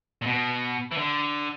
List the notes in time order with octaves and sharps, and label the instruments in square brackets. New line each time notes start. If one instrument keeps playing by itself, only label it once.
[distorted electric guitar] A#2
B2
E3
D3